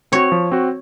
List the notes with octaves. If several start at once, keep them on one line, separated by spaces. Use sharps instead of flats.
C4 F#4 C#5
F3
C4 F#4